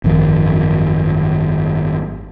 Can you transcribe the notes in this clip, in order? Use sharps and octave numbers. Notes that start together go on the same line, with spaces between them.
G#1 F#2 D#3 F3